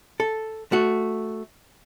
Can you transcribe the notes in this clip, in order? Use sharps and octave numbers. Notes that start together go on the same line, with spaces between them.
A4
A3 F#4